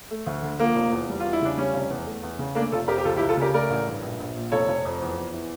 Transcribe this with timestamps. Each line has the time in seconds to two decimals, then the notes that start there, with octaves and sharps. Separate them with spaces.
0.11 A3
0.26 D2
0.43 D3
0.59 F3 A#3
0.76 F1
0.92 E2
1.09 G3
1.20 E2 F4
1.33 E4
1.42 C#3 D4
1.57 G3 C#4
1.74 F1
1.90 E2
2.06 A3
2.23 E2
2.39 C#3
2.55 A3 A#3 D4
2.72 F1 F4 A4
2.88 F2 G4 A#4
2.98 G4
3.04 C#2 F4 A4
3.16 E4 G4
3.21 C#2
3.29 F4 A4
3.37 C#3 G4 A#4
3.53 A3 A#4 D5
3.70 A1
3.87 G2
4.02 A#1
4.20 A#1
4.36 A#2
4.52 F1 A4 C#5
4.68 F1
4.85 F2
5.01 E2
5.17 E2
5.33 E3